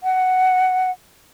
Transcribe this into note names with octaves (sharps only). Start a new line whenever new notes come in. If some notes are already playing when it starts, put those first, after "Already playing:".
F#5